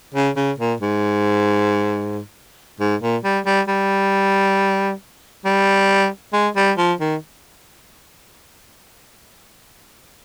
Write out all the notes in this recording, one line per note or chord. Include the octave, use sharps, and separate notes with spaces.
C#3
C#3
A#2
G#2
G#2
A#2
G3
G3
G3
G3
G#3
G3
F3
D#3